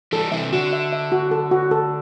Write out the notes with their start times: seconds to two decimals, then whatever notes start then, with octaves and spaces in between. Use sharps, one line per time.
0.12 E3 G3 A4
0.32 C3 E3 E5
0.53 D3 F#4
0.73 E5
0.92 E5
1.12 F#4
1.31 A4
1.51 F#4
1.71 A4